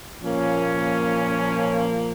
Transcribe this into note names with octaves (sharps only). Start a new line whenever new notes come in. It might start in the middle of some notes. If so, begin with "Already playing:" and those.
A#2 F3 A#3 C#4